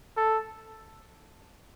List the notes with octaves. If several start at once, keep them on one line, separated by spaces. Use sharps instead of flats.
A4